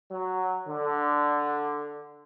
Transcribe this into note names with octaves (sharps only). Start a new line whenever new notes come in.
F#3
D3